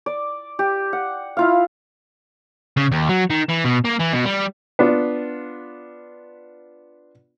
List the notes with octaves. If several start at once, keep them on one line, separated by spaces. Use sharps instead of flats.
D5
G4
F#5
E4 F4 F5
C#3
D#2
F#3
D#3
E3
B2
A#3
E3
B2
G3
B3 D4 F4